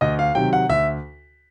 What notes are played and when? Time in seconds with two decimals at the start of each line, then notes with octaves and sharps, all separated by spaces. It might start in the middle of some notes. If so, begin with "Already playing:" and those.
0.01 D2 D#5
0.19 F5
0.35 C3 D#3 F#3 G5
0.53 F#5
0.69 D2 E5